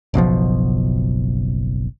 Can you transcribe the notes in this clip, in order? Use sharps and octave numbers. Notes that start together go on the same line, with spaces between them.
F#1 B1 B2 F3